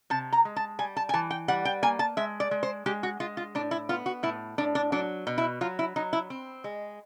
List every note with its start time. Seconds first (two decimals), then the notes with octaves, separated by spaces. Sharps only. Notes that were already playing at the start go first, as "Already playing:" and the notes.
0.10 C3 A5
0.33 A#5
0.45 G#3
0.56 A5
0.79 G3 G#5
0.97 A5
1.09 G#5
1.14 E3 A5
1.31 G5
1.48 G3 F#5
1.65 G5
1.83 A#3 G#5
1.99 A5
2.17 G#3 E5
2.40 D5
2.51 G#3
2.63 C5
2.86 G#3 G4
3.03 F#4
3.20 G#3 F4
3.37 F4
3.55 A2 D4
3.71 E4
3.89 B3 F4
4.06 F#4
4.23 A2 E4
4.58 A2 D4
4.75 D4
4.92 F#3 D4
5.27 B2
5.38 E4
5.61 F#3 F4
5.79 E4
5.96 F#3 D#4
6.13 E4
6.30 C4
6.64 G#3